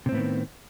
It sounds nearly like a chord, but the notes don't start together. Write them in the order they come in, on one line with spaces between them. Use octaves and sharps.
C3 C4 A2 B3 D#3